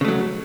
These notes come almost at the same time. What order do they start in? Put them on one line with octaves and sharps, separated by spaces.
C#3 A3 F#3